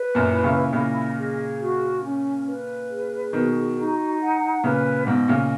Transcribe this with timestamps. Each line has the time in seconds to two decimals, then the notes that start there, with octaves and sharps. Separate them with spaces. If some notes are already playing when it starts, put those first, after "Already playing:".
Already playing: B4
0.15 F#2 A#2
0.30 E4
0.44 A#2 C#3
0.73 A#2 C#3 D#5
1.17 G#4
1.60 F#4
2.04 C#4
2.47 B4
2.90 G#4
3.33 B2 D#3 F#4
3.77 D#4
4.21 F#5
4.64 A#2 C#3 B4
5.07 G#2 B2 D#5
5.28 A#2 C#3